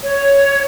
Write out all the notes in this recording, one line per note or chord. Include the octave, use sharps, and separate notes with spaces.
C#5